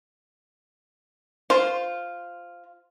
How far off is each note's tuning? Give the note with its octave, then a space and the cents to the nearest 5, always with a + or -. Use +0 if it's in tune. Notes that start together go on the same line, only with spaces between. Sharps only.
F4 +0 C5 -10